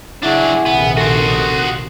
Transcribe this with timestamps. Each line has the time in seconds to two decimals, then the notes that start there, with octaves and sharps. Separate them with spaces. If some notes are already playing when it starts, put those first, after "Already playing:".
0.23 C#3 F#3 D4 E4 G#4 E5 F#5
0.66 A#1 C3 D#3 B3
0.97 F#4 A4 C5
1.27 D#6 F#6